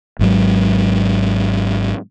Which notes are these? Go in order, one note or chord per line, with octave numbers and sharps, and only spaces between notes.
G#1 G#2 F#3